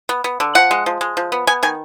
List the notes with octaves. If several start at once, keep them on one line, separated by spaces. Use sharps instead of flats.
B3
B3
D3
F3 F#5
G#3
F3
G#3
F3
B3
B3 G#5
D#3 G#5